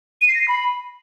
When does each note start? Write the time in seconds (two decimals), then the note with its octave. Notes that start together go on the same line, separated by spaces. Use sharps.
0.21 D#7
0.28 C7
0.35 A#6
0.41 C7
0.48 B5